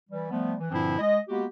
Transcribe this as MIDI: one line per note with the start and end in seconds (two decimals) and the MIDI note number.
0.10 0.28 52
0.10 0.28 55
0.31 0.54 53
0.31 0.54 55
0.31 0.54 57
0.31 0.54 59
0.60 0.70 52
0.71 0.97 43
0.71 0.97 46
0.71 0.97 50
0.71 0.97 53
0.71 0.97 60
0.71 0.97 64
0.99 1.18 56
0.99 1.18 75
1.29 1.45 56
1.29 1.45 58
1.29 1.45 59
1.29 1.45 66
1.29 1.45 67